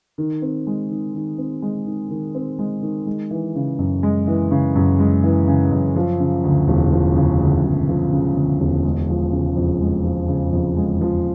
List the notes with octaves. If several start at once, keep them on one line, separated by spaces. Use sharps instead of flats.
D#3
C4
G#3
D#3
D#3
C4
G#3
D#3
D#3
C4
G#3
D#3
G#3
E3
C#3
F#2
G#3
E3
C#3
F#2
G#3
E3
C#3
F#2
F3
C#3
D2
E1
F3
C#3
D2
E1
F3
C#3
D2
E1
G#3
F3
C#3
F2
G#3
F3
C#3
F2
G#3
F3